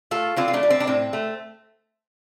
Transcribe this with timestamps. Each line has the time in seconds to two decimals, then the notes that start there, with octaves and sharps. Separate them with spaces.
0.11 A3 F4 A4
0.36 D3 C4 F4
0.48 F4
0.53 A3 D4
0.63 G3
0.70 C4
0.80 D4
0.87 A2 C4
1.13 A3